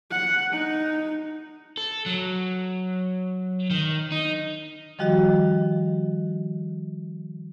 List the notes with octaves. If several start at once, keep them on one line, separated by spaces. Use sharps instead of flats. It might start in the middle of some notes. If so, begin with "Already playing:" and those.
F#5
D#4
A4
F#3
D#3
D#4
D#3 F3 G3 F#4 G4 D#5